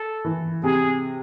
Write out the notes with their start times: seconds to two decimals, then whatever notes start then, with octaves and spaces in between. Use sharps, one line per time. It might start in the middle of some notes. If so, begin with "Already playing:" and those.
Already playing: A4
0.25 E3
0.63 C3 G#4